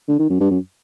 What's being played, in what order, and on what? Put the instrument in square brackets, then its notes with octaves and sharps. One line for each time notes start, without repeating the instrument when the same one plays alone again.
[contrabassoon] D3
D#3
F#2
G2
F#2